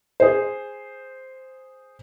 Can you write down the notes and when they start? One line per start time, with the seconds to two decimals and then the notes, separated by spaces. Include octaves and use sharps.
0.20 G#4 C5